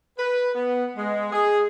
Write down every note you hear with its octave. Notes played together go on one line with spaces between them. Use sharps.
B4
B3
G#3
G#4